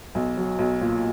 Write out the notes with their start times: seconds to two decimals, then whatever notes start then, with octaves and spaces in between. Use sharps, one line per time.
0.15 B1
0.37 F#3
0.59 B1
0.81 A#2